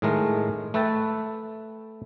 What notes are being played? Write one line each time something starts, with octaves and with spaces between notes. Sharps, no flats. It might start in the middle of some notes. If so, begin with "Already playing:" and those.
A2 D#3 G#3 A3 A#4
A3 B4 E5 G5 A5